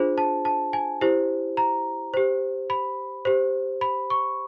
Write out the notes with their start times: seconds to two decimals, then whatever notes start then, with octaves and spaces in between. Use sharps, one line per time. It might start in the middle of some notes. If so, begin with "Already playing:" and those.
Already playing: D4 F4 G#4 C5
0.18 A5
0.45 A5
0.73 G#5
1.01 E4 G4 C5
1.57 A#5
2.14 G4 C5
2.70 B5
3.25 G4 C5
3.81 B5
4.10 C#6